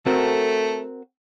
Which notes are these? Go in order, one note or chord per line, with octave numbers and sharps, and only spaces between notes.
A3 C4 F#4 A4 A#4